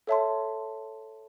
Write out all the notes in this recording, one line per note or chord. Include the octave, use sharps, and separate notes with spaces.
A4 C#5 E5 A5 C6